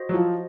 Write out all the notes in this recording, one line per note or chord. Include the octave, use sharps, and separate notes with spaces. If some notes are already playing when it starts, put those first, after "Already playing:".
Already playing: F#4 C5 D#5
F#3
F3